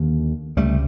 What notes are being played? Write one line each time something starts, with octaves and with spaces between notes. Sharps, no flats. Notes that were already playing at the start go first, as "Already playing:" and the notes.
Already playing: D#2 D3
C#2 C3 G3 A3